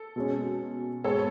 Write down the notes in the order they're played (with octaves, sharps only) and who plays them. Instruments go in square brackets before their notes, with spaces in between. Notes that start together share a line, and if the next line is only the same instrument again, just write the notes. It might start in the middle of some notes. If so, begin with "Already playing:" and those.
Already playing: [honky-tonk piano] A4
[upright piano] B2 G#3 C#4
[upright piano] G#2 G#3 B3 [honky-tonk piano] A4 C#5